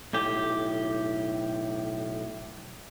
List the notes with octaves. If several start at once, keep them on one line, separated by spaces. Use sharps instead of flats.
B1 A2 G4